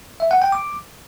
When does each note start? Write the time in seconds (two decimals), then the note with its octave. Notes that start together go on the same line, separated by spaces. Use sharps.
0.20 E5
0.31 F#5
0.42 G5
0.52 D6